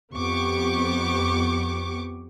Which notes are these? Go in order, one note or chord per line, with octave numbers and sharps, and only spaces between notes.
F2 B3 G4 C#6 D6